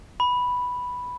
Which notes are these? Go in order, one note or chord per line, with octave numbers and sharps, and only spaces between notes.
B5